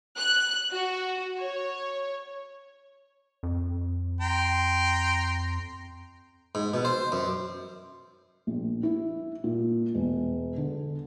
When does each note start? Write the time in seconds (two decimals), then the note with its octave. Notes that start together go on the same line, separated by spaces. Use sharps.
0.18 F#6
0.71 F#4
1.39 C#5
3.43 F2
4.21 G5 A#5 C6
6.55 G#2
6.74 B2
6.85 C5
7.12 F#2
8.47 A#1
8.83 E4
9.44 A#2
9.94 E1
10.58 D3